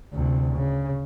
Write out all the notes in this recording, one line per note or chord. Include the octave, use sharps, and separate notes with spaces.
D2 C3
C#3